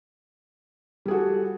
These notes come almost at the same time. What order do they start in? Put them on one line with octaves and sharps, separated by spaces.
G3 G#4 F#4 A4